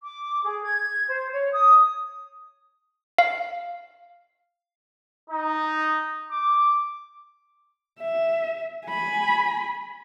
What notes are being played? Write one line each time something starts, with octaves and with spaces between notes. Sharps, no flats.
D6
G#4
G#6
C5
C#5
D#6
F5
D#4
D6
E5
G#5 B5